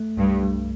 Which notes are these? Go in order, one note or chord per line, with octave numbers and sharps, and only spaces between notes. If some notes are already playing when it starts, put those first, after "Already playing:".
Already playing: A3
C2 G2
G3